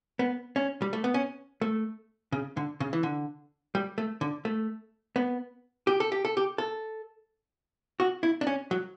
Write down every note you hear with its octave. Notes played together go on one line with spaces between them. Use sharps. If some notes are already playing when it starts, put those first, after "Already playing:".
B3
C#4
G3
A3
B3
C#4
A3
C#3
D3
C#3
E3
D3
G3
A3
D3
A3
B3
G4
A4
G4
A4
G4
A4
F#4
E4
D4
C#4
F#3